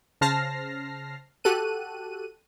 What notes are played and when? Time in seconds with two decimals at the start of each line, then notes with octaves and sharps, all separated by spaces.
0.21 C#3 C5 A5 F6 A#6 C7
1.44 F#4 G4 A4 F#6 D#7